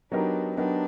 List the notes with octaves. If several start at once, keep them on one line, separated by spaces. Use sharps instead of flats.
F#3 B3 D4 D#4 G4 A#4
F#3 B3 D4 D#4 G4 A#4